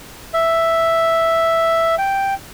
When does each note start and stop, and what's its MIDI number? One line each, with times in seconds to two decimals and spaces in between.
0.34 1.95 76
1.98 2.34 79